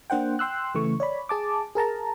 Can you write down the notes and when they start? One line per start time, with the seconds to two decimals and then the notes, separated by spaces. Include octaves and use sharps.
0.10 A#3 D4 C5 F#5 G5
0.39 G5 C6 E6 F#6
0.75 C#3 E3 A3 C#6
1.00 C#5 D5 B5
1.29 G#4 A5 D6
1.75 G#4 A#4 A5 A#5